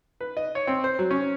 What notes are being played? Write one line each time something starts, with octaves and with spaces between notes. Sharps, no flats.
B4
D#5
C#5
C4
C5
F#3
C#4